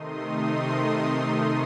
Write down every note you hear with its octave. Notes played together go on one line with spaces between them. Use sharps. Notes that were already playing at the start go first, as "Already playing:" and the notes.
Already playing: C3 D#3 A3 D#4 C6 D#6